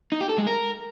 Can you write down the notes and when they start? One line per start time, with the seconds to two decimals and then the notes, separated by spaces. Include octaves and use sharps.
0.12 D#4
0.21 G4
0.29 A4
0.38 G#3
0.47 A#4